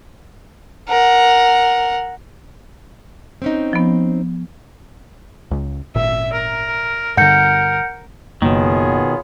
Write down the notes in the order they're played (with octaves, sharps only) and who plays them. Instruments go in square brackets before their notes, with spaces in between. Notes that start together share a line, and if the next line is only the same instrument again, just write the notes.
[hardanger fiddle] A#4 F#5
[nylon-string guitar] C4 C#4 D#4
[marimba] F3 B3
[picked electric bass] C#2
[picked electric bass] G#1 A#2 [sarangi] E5
[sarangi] A#4
[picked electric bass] G2 D3 [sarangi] A#4 [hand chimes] F#5 G6 C#7
[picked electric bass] F#1 A#3 [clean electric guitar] B2 D#3 [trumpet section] B3 F4 G#4 [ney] C#5